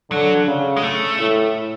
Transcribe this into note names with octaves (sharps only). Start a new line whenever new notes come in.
D3 F#3
C#3
G#3
A3
A2